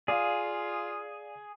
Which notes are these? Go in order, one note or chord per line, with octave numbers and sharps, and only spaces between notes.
F4 G#4 D5 F5